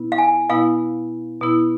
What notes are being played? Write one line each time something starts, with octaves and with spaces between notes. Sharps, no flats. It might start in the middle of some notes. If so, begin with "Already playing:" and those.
Already playing: B2 B3 E4
F5
G#5
B2 B3 E4 F5
B2 B3 E4